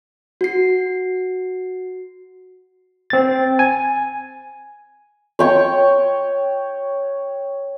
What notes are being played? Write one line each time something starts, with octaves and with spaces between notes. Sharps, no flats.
F#4 C7
C4 A6
G#5
C#5 G5 C#6